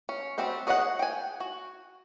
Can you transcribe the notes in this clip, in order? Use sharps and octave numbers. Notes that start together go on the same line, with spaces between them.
C#4
G3 C4 F#4 C5
G#4 C#5 D#5 F5 F#5
G5 G#5
F#4